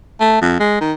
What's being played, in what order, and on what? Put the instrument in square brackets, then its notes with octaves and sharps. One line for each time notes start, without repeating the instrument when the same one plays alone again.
[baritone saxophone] A3
F2
G#3
D#3